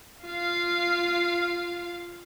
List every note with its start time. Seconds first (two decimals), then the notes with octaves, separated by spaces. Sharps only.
0.23 F4 F5